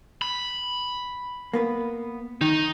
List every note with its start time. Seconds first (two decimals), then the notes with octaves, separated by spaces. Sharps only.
0.22 B5
1.54 A#3 B3 B4
2.41 D#3 D#4